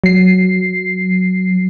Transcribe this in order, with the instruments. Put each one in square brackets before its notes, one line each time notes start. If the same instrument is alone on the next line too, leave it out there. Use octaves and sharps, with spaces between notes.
[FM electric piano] F#3 C7